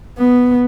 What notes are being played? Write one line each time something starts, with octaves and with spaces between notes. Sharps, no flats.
B3